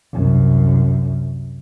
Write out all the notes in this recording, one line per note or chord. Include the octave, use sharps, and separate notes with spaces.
C2 F#2